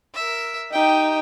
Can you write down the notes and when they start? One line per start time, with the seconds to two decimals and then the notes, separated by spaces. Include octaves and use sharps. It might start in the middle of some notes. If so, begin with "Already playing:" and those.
0.15 A#4 E5
0.72 D#4 G4 G5